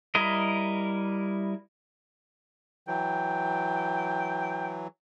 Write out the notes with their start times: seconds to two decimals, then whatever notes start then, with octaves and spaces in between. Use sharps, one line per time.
0.15 G3 E4 A#4 D#5
2.88 E3 F#3 G5